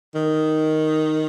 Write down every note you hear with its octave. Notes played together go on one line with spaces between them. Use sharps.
D#3